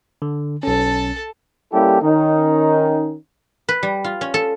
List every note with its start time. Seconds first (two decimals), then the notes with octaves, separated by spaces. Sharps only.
0.22 D3
0.63 B1 C#4 A4 A5
1.72 G3 A#3 C#4 E4 G4 A4
2.01 D#3 C#4 D#4
3.69 B4
3.83 G3
4.04 F4
4.21 C#4
4.34 A4